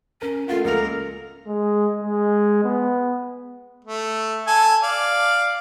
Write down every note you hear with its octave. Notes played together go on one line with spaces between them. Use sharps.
C#4 A#4
A3 F4 F5 F#5
C#2 A#3 A4 A#4 F7
G#3
G#3
B3
A3
A4 G#5 A5
D5 F5